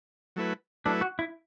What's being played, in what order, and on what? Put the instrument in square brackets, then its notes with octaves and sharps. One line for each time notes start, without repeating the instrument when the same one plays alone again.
[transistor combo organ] F#3 A3 E4 B4
[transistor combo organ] F#3 A3 E4 B4 [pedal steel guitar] D4
[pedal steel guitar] F#4
E4